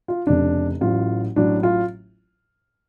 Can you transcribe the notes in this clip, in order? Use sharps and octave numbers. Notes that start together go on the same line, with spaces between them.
F4
F1 F2 C#3 D4
A1 A2 F#3 F4
A1 A2 F#3 D4
F4